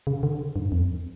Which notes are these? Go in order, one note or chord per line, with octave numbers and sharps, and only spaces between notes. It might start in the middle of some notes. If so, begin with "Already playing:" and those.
C#3
D3
G2
F2